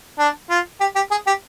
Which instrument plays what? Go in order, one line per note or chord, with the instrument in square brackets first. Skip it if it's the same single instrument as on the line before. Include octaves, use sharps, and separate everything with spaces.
[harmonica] D4
F4
G4
G4
G#4
G4